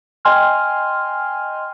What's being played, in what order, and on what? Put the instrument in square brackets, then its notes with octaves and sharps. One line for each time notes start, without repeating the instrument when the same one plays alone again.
[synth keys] D#5 G5 G#5 C6 F6